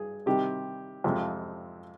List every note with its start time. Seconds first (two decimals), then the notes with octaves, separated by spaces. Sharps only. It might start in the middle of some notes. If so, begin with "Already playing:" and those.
Already playing: G2 G#4
0.26 C3 D#3 G3 C4 G4
1.04 F2 C3 F3 G#3